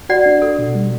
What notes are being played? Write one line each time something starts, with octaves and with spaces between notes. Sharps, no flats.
F#4 D5 F#5
D4
F#4 A4
B2
G3